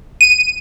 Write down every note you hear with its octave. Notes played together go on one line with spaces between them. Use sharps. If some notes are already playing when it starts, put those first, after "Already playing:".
D#7